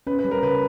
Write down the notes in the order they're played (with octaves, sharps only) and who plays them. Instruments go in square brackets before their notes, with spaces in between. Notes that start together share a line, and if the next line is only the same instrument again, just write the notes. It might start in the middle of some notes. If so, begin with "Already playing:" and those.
[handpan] C#4 [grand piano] B4
[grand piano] B4
[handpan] G3
[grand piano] A#4
[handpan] C#3 [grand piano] B4